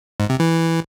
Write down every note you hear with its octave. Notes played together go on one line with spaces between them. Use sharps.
G#2
C3
E3